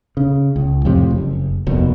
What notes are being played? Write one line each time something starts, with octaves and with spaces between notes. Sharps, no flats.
C#3
C#2
F2 A2 C3
F#1
F1 D#2 B2